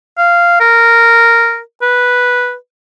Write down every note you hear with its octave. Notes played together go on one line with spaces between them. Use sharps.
F5
A#4
B4